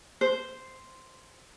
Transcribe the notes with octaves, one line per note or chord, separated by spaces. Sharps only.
C5